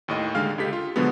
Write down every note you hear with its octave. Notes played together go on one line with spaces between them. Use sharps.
D#2 A2 D#5
D#2 D3 G#3 F5 F6
C#2 G4 A4 B6
F4
B2 D3 F3 F#3 G#3 B3